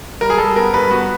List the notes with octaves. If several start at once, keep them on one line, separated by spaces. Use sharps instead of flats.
G3 A#4
G#4
G3 A4
B3 A#4
G2 B4
B3 F#4